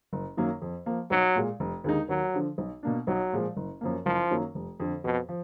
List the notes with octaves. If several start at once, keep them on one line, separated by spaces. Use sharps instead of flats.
F#1
F#2 D#3 F#3 A#3
F2
F3 A#3
B1 F#3
A#2 G#3
F1
D#2 D3 G#3 D#4
D#2 F#3
D3 F3
B1
B2 A#3 D4
B1 F#3
A#2 F3 G#3
F#1
F#2 F3 A#3
F#1 F3
F#2 D#3 F#3 A#3
F1
F2 D3
F2 B2
F3